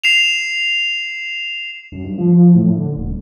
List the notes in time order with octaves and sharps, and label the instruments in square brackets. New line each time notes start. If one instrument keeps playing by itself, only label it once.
[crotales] C7 E7 F7
[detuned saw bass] F#2
G2
F3
F3
A2
D3
D#1